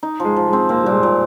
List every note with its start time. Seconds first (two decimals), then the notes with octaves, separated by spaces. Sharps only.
0.03 D#4
0.20 F3 G#3
0.36 F3
0.48 G#3 C4
0.69 A#3 C4
0.84 G3
0.86 A#2
0.92 G#3
1.03 A#2